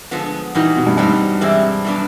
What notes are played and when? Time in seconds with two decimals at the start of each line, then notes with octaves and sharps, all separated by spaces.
0.11 G2 D3 F3 G#3 B3
0.55 A#2 E3 G3 A#3 D#4 F#4
0.77 B2
0.87 G2
0.97 E2 G2 B2 G3 C4 D#4
1.41 E3 G#3 C4 E4 G4
1.85 A2 F#3 B3 D4